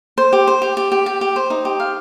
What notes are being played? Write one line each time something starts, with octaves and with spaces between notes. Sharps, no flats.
C5
G4
C5
G4
G4
G4
G4
G4
C5
D#4
G4
F5